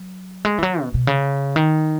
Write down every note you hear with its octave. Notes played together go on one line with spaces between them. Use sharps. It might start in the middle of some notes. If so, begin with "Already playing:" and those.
Already playing: F#3
G#3
E3
F#3
B2
B2
C#3
D#3